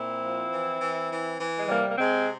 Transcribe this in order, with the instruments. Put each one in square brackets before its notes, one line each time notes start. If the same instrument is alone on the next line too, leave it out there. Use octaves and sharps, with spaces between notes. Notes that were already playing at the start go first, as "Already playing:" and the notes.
Already playing: [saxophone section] A#2 C4 E4
F3
E3
E3
E3
E3
G#3
C3 G3 A#3
A#3
C3 G#3 C4